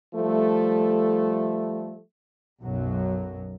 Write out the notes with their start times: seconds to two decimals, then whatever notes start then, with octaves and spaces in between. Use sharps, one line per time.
0.15 F3 G3 A3
2.63 B1 F#2 F#3